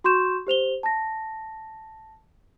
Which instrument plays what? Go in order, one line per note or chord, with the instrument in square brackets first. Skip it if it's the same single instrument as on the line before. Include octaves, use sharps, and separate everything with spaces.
[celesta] F#4 C6 C#6 G6 E7
G4 C5 F7 G7
A5 A#6